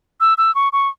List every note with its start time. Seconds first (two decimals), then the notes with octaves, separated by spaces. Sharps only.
0.21 E6
0.38 E6
0.55 C#6
0.73 C#6